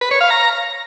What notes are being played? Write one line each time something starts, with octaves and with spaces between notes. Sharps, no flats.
B4
C#5
F5
A#5